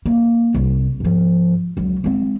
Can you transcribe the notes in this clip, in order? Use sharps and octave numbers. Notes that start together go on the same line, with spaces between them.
A#3
C2
G#2 F3
C#2 F#3
G#3 C4